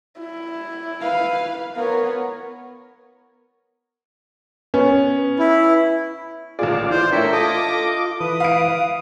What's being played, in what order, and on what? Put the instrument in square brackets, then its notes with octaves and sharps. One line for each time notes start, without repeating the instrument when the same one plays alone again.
[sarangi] E4
[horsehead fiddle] B4 F5
[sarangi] B3 [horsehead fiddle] A#4 C#5
[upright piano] B3 C#4
[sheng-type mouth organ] E4
[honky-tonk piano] A1 A#2 G#4 [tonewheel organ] F4 D5
[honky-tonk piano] E3 [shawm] C5
[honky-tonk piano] A3 D4 [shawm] E4 [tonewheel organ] A#4 C#5 G5
[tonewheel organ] F4 D6 [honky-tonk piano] A4 [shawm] D#5
[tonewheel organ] E3 B4 [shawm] D#6
[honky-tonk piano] F5 D7